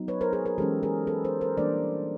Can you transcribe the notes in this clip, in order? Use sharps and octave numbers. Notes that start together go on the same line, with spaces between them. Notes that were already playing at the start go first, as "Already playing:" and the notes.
Already playing: F#3 B3 D#4
B4 C#5
A#4 C5
G#4 A#4
G#4 A#4
E3 G#3 C#4 G4 A4
G#4 A#4
A4 B4
A#4 C5
A#4 C5
E3 G3 A#3 D4 C5 D5